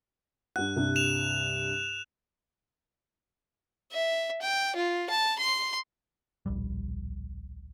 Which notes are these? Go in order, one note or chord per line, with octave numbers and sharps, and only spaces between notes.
G2 F#5 F#6
C2 G2
E7 F7
E5
G5
F4
A5
C6
D1 A#1 G3